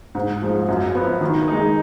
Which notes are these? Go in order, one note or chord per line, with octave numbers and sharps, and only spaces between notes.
G#2
F3 G#3
F#2
F3 B3
D#3
G#3 D#4